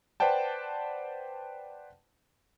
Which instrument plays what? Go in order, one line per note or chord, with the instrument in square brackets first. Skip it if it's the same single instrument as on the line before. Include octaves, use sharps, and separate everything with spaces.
[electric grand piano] B4 C5 D5 F#5 G5 A5